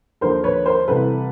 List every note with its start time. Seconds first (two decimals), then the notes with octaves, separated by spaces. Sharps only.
0.21 D#2 D3 F3 A#4 C5
0.44 B4 C#5
0.66 A#4 C5
0.88 C2 C3 E3 A4 B4